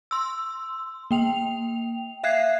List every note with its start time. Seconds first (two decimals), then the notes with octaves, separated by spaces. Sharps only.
0.11 C6 E6
1.11 A#3 G5 F7
2.24 E5 F5 F#6 G#6 C7